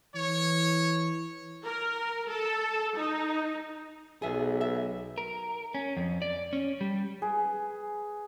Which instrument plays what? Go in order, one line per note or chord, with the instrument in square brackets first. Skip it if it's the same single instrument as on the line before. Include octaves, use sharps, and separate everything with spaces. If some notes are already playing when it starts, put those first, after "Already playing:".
[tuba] E3 [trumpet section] C#5
[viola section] A#4
A4
D#4
[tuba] B1 [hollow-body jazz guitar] G#4 E5
[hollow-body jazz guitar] E5
[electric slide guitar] A#4
C#4
F2
D5
C#4
G3
[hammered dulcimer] G#4 B4